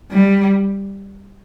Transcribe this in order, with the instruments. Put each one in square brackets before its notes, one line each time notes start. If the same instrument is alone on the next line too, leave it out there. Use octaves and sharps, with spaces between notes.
[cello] G3